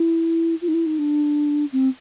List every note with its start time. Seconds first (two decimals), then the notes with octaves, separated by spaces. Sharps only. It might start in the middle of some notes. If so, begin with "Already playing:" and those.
Already playing: E4
0.62 F4
0.68 D#4
0.74 E4
0.86 D#4
0.99 D4
1.73 C4